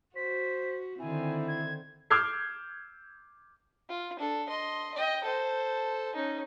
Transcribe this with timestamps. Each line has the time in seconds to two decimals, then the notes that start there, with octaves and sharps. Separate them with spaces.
0.16 F#4 C5 B6
0.99 D3 D#3 C4 E4 G#5
1.48 G#6
2.10 D6 E6 F6 G6 G#6 C7
3.89 F4
4.19 D4 A4
4.49 D#5 C6
4.94 D#5 G5
5.24 A4 C5
6.15 C#4 D#4